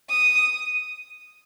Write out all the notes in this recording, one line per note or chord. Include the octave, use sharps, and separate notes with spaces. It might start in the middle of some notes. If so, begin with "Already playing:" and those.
D#6